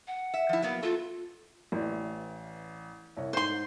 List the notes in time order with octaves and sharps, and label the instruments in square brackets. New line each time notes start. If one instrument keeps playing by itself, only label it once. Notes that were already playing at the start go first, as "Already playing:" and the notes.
[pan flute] F#5
[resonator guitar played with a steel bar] E5
F3 E4
F#3 A#3 B3
[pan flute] F4 [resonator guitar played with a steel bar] A4
[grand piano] A1 E3 D5
C2 C#5
[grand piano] G#2 [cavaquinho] C5 C6